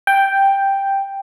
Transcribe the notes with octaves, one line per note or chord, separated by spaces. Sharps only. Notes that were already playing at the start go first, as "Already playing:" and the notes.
G5